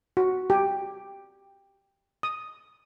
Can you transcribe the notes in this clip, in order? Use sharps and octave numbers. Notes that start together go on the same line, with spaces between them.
F#4
G4
D#6